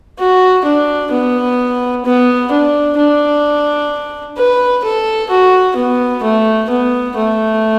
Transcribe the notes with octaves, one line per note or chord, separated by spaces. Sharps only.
F#4
D4
B3
B3
D4
D4
B4
A4
F#4
B3
A3
B3
A3